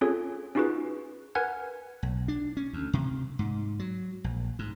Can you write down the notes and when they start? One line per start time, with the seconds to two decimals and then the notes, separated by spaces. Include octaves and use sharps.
0.01 C4 C#4 F4 G#4 A4 C#5
0.55 C#4 D#4 F4 F#4 G#4 B4
1.35 A#4 B4 F#5 G#5 F6 G#6
2.03 B1
2.28 D4
2.57 C#4
2.73 D2
2.93 C3
3.39 G#2
3.79 F#3
4.24 A#1
4.59 G#2